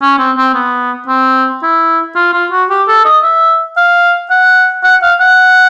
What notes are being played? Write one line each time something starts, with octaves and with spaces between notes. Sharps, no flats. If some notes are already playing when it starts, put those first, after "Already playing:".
C#4
C4
C4
B3
C4
E4
F4
F4
F#4
G4
A4
D#5
E5
F5
F#5
F#5
F5
F#5